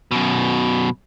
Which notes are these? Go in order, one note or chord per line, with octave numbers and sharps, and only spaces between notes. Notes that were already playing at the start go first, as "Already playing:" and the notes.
F#2 B2